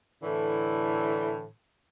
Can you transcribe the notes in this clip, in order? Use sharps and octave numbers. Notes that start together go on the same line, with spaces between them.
A2 D3 E3